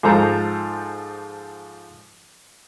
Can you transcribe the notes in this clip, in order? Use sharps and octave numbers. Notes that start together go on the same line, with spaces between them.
G#2 F3 A4 C5 A#5